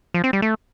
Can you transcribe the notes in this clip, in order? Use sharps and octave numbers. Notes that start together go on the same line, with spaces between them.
F3
C4
G3
A3